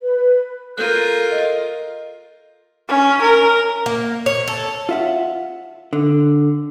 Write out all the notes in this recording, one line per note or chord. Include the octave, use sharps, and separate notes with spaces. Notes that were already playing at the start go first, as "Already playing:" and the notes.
B4
F4 A4 A#4 F#6 G6 D#7
D#5
C#4
A#4
A#3
C#5
A4
F4 E5 F#5
D3